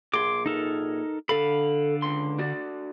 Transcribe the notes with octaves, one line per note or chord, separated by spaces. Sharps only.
A#2 G#4 C6 D6
D#4 A4 A#4
D3 A4 F5 B5
C#2 C6
D4 F#4 D5